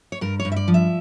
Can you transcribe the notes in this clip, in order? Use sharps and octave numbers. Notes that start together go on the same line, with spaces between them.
C#5
G2 A#4
C#5
G2
E5
D5
F3
E5